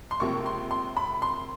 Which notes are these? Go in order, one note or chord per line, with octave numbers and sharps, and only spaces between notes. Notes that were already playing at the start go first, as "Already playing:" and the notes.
C6
C#2 C3 F3 A#3 C#6
C6
C6
B5
C6